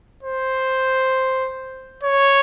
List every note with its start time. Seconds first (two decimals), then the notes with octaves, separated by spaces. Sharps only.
0.23 C5
2.04 C#5